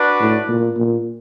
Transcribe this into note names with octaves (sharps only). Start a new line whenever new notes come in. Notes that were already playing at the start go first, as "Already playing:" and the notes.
Already playing: D4 F#4 B4 D5
A2
A#2
A#2